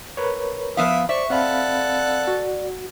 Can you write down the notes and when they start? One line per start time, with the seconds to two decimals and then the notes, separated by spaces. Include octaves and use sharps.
0.17 A#4 B4 C#5
0.77 F3 B3 E4 E5 F5 D#6
1.09 C5 D5 E5 C#6
1.30 C4 A4 D5 F5 F#5 B5
2.27 F#4